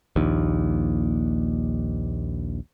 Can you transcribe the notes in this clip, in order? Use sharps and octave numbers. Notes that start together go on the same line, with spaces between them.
A#1 D#2